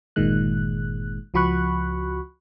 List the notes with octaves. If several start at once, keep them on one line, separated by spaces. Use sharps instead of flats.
G1 A#2 D#3 G#3 F#6
C#2 F3 F#4 B5 C#6 F#6